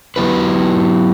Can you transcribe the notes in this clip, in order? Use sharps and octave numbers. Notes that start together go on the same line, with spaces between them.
F#3 B3 E4 G4 B4